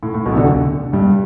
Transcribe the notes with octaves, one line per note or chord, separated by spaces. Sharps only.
A2
A2
B1 B2
C3
D2 D3
G2 G3